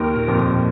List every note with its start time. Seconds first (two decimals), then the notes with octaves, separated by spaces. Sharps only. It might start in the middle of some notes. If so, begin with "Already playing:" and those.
Already playing: D#2 D#3 A#4
0.16 A#2
0.27 F2 F3
0.39 A#2